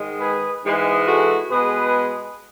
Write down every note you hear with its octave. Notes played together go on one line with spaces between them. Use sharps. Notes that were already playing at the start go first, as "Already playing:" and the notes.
Already playing: G#2 D#3 G#3
G#4 B4
G#2 E3 G#3
F#4 A4
B2 G#3 G#4 B4